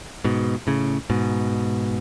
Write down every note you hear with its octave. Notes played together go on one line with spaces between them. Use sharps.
G#2 B2
A2 C#3
G#2 B2